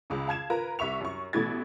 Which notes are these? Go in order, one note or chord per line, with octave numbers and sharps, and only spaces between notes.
C#2 C#3
F5 A5 G#6 E7
F4 A#4 B4 A#5
C2 E5 C#6 F7
F#2 C#6
A1 B2 A3 E4 G#6 A6